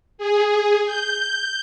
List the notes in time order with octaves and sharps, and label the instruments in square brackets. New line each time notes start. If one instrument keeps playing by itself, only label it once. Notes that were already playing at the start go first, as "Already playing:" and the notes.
[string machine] G#4
G6